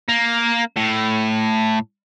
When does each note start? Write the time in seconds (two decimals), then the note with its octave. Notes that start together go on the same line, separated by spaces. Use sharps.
0.08 A#3
0.77 A2